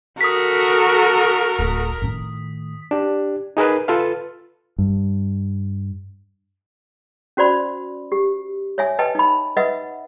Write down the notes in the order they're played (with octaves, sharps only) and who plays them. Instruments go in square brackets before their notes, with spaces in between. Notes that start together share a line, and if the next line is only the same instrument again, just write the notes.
[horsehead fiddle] F#4 A4 [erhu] A#4 [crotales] D#6 B6
[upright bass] D1
A2 D#3
[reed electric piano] D4 G4
D#4 G#4 A#4 B4
F4 A4 B4 F5
[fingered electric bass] G2
[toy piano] C#4 F#4 C5 D5 B5
G4
C#5 E5 G#5
B4 D#5 G5 A5
D#4 B5
B4 D#5 E5 F#5